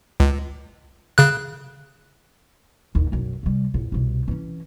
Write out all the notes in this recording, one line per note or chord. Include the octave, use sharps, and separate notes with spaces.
C#2
C#3 F#6
A#1 D#2
B1 F#2
C3 G3
A#1 E2
C2 B2
E3 C#4